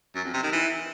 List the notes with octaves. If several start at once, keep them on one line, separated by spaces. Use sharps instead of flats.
F#2
F2
C3
D#3
E3